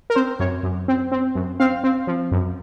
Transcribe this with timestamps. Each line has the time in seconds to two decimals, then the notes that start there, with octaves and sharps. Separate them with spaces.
0.10 A#4
0.16 C4 C5
0.39 F#2 C#5
0.63 F#2
0.88 C4
1.12 C4
1.35 F#2
1.60 C4 F5
1.84 C4
2.07 F3
2.31 F#2